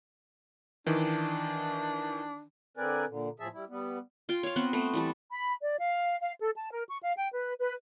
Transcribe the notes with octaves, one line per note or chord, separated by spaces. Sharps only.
D#3 E3 D4
D3 C4 A#4 B4 D5 G#5
A#2 D3
E2 A2 F3 G#4 E5 A5
G3 E4
G3 B3
F4 G5
C#5 F5
B3 C4 F#5
A3 B3 C4
E3 G3 A4
B5
D5
F5
F5
A4
A5
A#4
C#6
F5
G5
B4
B4